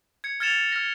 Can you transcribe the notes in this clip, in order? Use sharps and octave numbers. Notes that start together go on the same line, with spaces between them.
G#6 C#7
F6 G#6 A6 C#7 E7 F7
F6 A#6